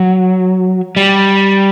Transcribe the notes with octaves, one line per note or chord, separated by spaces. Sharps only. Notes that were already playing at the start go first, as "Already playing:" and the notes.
Already playing: F#3
G3